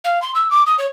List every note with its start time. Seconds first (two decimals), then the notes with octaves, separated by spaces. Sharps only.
0.04 F5
0.22 C6
0.35 E6
0.51 D6
0.66 D#6
0.78 C#5